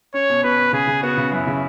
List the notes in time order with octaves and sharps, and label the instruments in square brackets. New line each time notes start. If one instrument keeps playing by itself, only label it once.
[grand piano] C#4 [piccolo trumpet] C#5
[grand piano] B2
[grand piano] B2 [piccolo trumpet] B4
[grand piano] B2
[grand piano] C#3 [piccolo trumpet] G#4
[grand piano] C#3
[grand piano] B3 [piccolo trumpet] F#4
[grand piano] C#3
[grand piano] F#2 [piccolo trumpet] E4
[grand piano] C#3